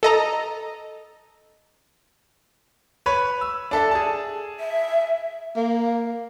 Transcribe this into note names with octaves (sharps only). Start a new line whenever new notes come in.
A4 D#5 A#5
B4 C#5 B5
E6
D4 A4 E5
G#4 A5
E5
A#3